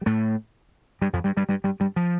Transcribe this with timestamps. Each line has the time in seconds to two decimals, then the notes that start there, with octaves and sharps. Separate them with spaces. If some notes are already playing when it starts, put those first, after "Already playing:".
0.01 G3
0.06 A2 A3
1.01 G2 G3
1.13 F2 F3
1.24 G2 G3
1.37 G2 G3
1.49 G2 G3
1.64 G2 G3
1.80 G2 G3
1.96 F3